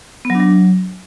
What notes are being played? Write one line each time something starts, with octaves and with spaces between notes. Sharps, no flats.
B3
F#3
D4
F#3